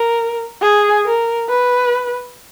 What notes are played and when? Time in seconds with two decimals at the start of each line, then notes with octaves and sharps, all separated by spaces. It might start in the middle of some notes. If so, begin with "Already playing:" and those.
Already playing: A#4
0.62 G#4
1.05 A#4
1.49 B4